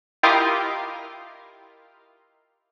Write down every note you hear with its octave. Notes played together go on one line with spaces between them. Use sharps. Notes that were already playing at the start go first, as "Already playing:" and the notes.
E4 F4 G4 A#4 D#5 F5